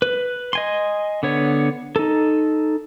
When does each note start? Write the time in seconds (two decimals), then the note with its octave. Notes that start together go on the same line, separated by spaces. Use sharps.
0.02 B4
0.53 D#5 G#5 C6
1.23 D3 B3 C#5
1.96 D#4 A4